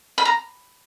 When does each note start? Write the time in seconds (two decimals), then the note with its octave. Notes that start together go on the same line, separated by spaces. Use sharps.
0.18 B5
0.25 A#5